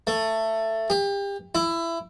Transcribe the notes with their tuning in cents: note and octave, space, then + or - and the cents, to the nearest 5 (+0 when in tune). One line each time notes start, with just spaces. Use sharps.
A3 +15
G4 +30
E4 +20